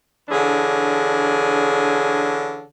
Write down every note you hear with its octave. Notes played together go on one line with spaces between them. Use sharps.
D3 E3 C#4 D4 G#4